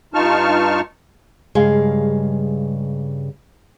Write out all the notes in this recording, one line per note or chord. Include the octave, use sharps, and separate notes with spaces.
G2 D#4 F4 A5 C#6 F6
G2 C#3 G#3 F5